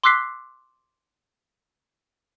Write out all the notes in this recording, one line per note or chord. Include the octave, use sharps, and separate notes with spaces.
C6 D6 E6 F#6 B6 C7